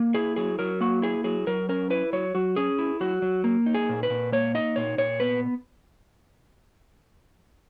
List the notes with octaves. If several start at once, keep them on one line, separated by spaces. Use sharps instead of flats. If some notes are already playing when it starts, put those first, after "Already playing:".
Already playing: A#3
E4 G#4
F#3 G#4
F#3 A#4
A#3 F#4
E4 G#4
F#3 G#4
F#3 A#4
C#4 A#4
E4 B4
F#3 C#5
F#3 F#4
C#4 G#4
E4
F#3 F#4
F#3
A#3
D#4
G#4
A#2
B4
A#2
A#3 C#5
D#4 D#5
A#2 C#5
A#2 C#5
B3 B4